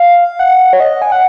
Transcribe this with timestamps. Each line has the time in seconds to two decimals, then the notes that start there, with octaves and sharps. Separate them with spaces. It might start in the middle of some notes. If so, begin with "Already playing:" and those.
Already playing: F5
0.39 F#5
0.73 C#5
0.80 D#5
1.02 G#5
1.12 F#5